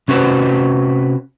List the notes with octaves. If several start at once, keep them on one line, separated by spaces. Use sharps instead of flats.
C3 C#4 F#4 B4 C5